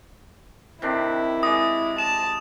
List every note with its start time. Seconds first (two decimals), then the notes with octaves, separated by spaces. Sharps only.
0.82 C3 D#3 D4 E4
1.43 G#3 D5 D#5 D#6
1.98 A5 E7